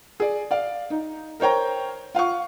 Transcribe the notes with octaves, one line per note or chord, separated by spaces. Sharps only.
G#4 D5
D5 F5
D#4
A#4 C5 C#5 G5 A#5
F4 F5 F#5 C#6